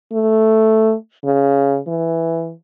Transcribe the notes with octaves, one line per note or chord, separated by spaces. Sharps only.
A3
C#3
E3